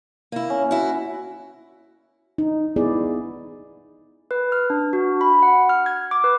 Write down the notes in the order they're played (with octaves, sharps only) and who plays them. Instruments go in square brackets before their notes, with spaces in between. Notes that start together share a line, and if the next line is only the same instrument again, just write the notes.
[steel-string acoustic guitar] A#3 E4
[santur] C#4
[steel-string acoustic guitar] E4 F#4
[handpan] D#4
B3 E4 G#4 D5
[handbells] B4
F6
D4
F#4
B5
F#5
F6
G#6
D6
B4